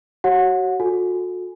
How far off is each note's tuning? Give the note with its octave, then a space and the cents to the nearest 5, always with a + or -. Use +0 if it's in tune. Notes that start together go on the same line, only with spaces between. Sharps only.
F#4 +25 C#5 -20 F#5 -30
F#4 -40 A4 +0 G#5 +15